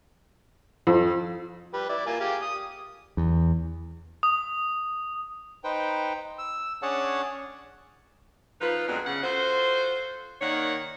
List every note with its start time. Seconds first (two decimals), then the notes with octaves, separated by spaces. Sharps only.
0.87 F2
1.74 G3 B4
1.89 E4 D5
2.06 A#3 F4 G#5
2.20 G4 G#4 F5
2.42 D#6
3.17 E2
4.23 D#6
5.64 D#4 B4 C5 G5
6.38 E6
6.82 C#4 D4 G#4 C#5 F#5 A5
8.61 F3 D#4 F4 B4
8.88 F2 F#3 G#3 B3 D4
9.06 C#3 F#5
9.24 F4 F#4 A4 C5
10.41 D#3 A#3 D#4 C#5 D5 F#5